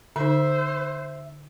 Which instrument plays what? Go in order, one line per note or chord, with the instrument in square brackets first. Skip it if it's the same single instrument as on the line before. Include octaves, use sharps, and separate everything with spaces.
[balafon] D3 D#4 [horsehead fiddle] C5 [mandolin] E5